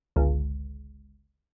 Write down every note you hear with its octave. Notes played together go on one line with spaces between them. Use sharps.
G1 C#2